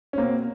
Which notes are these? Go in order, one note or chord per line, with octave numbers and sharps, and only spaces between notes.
C#4
B2 A#3 C4